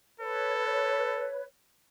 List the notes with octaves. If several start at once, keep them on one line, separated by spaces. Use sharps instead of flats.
A4 B4 C#5